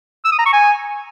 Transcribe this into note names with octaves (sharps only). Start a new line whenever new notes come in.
E6
D#6
A#5
C#6
G#5